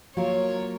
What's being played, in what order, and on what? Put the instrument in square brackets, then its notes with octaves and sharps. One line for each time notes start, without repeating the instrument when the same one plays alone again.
[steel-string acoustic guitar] F#3 A#3 F4 A#4 [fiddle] C#5